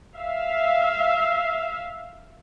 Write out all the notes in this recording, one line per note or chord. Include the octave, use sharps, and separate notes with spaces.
E5 F5